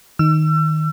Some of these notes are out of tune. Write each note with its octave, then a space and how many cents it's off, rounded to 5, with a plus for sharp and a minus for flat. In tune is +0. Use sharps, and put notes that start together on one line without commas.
D#3 +0 E6 +35